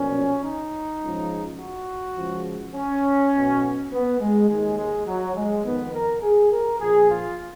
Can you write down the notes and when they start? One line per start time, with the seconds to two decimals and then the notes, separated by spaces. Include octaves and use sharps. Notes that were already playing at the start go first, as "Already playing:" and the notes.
Already playing: B1 A#2 F3 C#4
0.43 D#4
1.01 C#2 C#3 F3
1.60 F#4
2.17 C#2 C#3 F3
2.75 C#4
3.33 B1 B2
3.91 B3
4.20 G#3
4.48 D#2 D#3 G#3
4.78 G#3
5.06 F#3
5.35 G#3
5.64 F2 D#3 B3
5.93 A#4
6.22 G#4
6.51 A#4
6.80 A#1 A#2 F3 G#4
7.09 F4